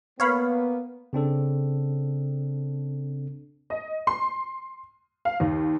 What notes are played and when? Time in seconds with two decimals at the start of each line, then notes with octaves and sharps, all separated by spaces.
0.20 A#3 B3 C#5 F5 B5
1.13 C#3 C4 D4 A4
3.70 D#5
4.07 C6
5.25 F5
5.40 D#2